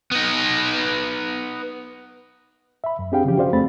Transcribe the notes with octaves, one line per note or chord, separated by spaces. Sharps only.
B3 D#4
E5 B5
F#2
C4 D4 G4 G#4 F5 G5
C#3 E3 F3 C#4 G4
F#4 G#4 C5 D5 F5
F2 A3 C4 B5 A6